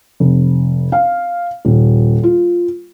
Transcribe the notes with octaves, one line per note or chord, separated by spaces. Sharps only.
F1
F5
D#1
F4